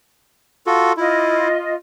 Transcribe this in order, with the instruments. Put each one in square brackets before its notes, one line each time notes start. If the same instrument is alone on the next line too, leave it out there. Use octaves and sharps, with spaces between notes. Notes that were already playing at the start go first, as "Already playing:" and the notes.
[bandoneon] F4 F#4 A4
[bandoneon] E4 [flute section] F4 D#5